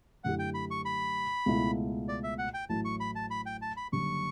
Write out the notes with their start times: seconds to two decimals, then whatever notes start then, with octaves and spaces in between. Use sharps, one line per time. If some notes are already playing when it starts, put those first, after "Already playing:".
0.24 F#2 D3 A3 E4 G4 F#5
0.39 G5
0.54 B5
0.71 C#6
0.85 B5
1.46 C#2 B2 A3 E4
2.09 D5
2.23 E5
2.38 F#5
2.54 G5
2.69 A1 A2 F#3 A3 E4 A5
2.85 C#6
3.00 B5
3.15 A5
3.31 B5
3.46 G5
3.62 A5
3.77 B5
3.92 F#1 F#2 D3 G3 C#6